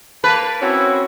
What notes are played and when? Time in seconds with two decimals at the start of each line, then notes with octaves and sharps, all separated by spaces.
0.24 A#3 B4 A5
0.62 C4 C#4 E4 F#4